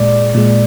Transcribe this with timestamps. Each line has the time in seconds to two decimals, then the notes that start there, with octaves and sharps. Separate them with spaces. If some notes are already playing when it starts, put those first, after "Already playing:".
Already playing: A#2 G#3 D5
0.34 A#2 G#3